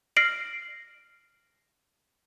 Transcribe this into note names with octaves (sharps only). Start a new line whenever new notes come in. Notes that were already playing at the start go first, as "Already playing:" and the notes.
F6 A#6 C7 D7 F#7